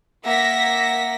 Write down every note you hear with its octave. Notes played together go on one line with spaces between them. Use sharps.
A#3 E5 F#5 A#6 B6